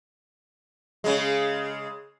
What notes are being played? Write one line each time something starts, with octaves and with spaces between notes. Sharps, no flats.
C#3 G#3